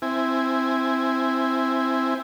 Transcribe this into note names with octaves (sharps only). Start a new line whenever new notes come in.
C4 E4 G#5